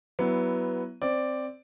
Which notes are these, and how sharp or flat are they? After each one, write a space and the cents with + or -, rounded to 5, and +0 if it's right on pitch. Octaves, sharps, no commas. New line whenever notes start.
F#3 +20 B3 +0 E4 +10
C4 +0 D5 +0